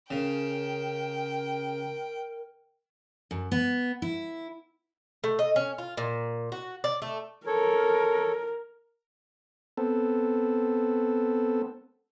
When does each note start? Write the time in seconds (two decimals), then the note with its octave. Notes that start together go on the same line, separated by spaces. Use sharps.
0.11 C#3 A#4 G5
3.31 F#2
3.52 B3
4.02 E4
5.24 A3
5.39 D#5
5.56 C#4
5.78 F4
5.97 A#2
6.52 F#4
6.84 D5
7.02 A3
7.47 A4 A#4 C#5
9.77 B3 C4 A4